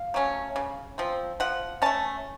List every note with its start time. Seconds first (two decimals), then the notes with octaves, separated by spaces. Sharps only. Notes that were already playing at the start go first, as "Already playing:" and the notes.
Already playing: F5
0.14 F#3 A3 C#4
0.56 C#3
0.98 F3 C4
1.40 F3 F#5
1.82 A3 C#4 A5